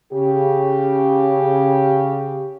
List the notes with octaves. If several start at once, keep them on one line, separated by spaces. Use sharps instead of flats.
C#3 G4